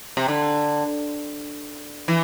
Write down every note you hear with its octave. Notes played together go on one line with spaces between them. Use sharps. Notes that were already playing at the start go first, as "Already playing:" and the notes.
C3
D3
E3